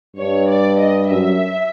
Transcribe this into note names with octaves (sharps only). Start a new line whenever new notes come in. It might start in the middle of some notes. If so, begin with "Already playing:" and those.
G2 C#5
D5
D#5
F#2 E5